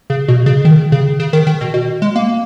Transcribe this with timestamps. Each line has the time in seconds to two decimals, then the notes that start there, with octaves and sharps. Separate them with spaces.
0.10 C#3
0.28 B2
0.46 C#3
0.65 D#3
0.92 C#3
1.20 C#3
1.33 D#3
1.47 D#3
1.61 B2
1.74 B2
2.02 G#3
2.16 A#3